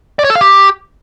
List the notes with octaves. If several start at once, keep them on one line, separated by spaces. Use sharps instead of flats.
D5
C#5
A4
F5
G4